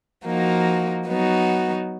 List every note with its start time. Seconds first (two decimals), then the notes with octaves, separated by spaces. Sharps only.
0.25 F3 A#3 D#4 F#4
1.07 F#3 B3 D#4 F#4